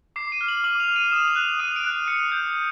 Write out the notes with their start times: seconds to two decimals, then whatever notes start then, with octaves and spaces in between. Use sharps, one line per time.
0.16 D6 C7
0.32 D#7
0.41 F6
0.48 F#7
0.64 D6 F#7
0.80 F7
0.88 F6
0.96 D#7
1.12 D#6 E7
1.28 F7
1.36 F#6
1.60 D#6 D#7
1.76 D7
1.85 F#6
2.08 D#6 C#7
2.32 G6